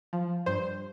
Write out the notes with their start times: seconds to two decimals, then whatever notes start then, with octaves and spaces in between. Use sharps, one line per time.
0.13 F3
0.46 G2 C5